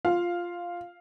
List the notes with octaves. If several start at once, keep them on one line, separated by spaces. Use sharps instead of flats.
F4 F5